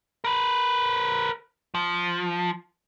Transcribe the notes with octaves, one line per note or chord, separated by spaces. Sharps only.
A#4 B4
F3